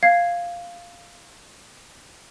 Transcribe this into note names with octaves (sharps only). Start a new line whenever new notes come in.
F5 G#6 C7